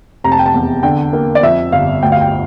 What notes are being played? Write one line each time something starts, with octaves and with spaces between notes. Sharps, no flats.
F1 A#5
A5
G5
A5
E2
D3 G5
A#3
D5
F2 E5
G1 F5
D2 G5
F5
G5